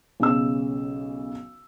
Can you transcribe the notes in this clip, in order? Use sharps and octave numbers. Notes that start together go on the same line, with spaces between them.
B1 C#3 E6